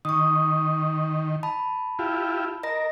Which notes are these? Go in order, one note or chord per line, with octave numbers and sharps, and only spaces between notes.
D#3 C#6 D#6
A5 B5
E4 F4 G4
A#4 D#5 A#6